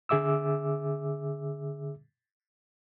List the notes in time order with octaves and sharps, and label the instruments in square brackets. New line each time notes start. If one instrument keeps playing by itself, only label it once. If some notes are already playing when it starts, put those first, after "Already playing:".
[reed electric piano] D3 G#4 E5 D6 E6